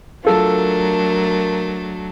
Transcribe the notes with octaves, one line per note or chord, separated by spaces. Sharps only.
F#3 A3 D4 F4 A4 A#4